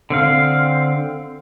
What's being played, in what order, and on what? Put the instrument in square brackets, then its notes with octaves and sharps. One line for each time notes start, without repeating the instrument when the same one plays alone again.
[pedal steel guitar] D3 C4 F5